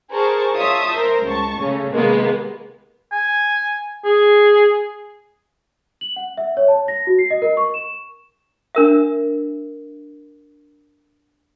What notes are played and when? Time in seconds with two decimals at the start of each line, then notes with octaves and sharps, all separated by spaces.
0.13 G#4 A#4 C5 A5 C#6
0.56 F4 C#5 E5 A5 D#6
0.91 A#4 C5
1.26 C#2 A5 C#6
1.59 C#3 A3 C#4
1.93 C3 D#3 G#3 A#3 B3
3.12 G#5
4.05 G#4
6.01 F#7
6.16 F#5
6.37 E5
6.57 C#5
6.68 A5
6.88 A#6
7.07 F#4
7.19 C7
7.30 D#5
7.42 A#4
7.57 C#6
7.74 E7
8.75 D4 A#4 E5